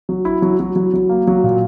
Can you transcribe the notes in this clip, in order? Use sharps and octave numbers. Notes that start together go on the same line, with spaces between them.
F#3
E4
F#3
F#3
F#3
F#3
A#3
F#3
A#2